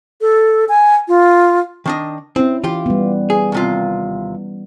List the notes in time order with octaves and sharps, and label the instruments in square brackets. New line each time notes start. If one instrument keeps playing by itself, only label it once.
[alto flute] A4
G#5
F4
[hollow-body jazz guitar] D#3 D4 D#5
[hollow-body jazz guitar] C4 [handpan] C#4 E4
[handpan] E3 [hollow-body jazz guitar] F4 G4
[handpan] G3 B3
[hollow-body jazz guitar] G#4
D#2 C3 F4